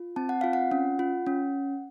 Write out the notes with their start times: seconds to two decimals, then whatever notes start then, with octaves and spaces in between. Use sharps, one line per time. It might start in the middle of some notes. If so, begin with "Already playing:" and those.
Already playing: F4
0.16 C4 A5
0.29 F#5
0.41 F4 F5
0.53 F#5
0.71 C#4
0.99 F4
1.27 C#4